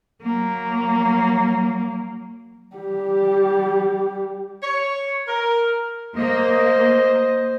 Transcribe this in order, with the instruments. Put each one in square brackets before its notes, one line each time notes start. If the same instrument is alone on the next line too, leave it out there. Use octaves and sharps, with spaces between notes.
[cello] F#3 A#3
[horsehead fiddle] G3 G4
[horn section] C#5
A#4
[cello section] A#3 [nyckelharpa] C5 [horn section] D#5